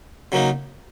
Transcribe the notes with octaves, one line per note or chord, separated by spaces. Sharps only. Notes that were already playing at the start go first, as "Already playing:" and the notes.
C#3 F#3 A#3 D#4